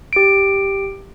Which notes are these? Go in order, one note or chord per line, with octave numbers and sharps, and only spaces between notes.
G4 D7